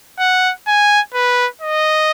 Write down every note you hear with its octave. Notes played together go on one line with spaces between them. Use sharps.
F#5
G#5
B4
D#5